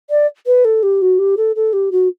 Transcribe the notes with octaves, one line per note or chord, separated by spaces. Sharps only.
D5
B4
A4
G4
F#4
G4
A4
A4
G4
F#4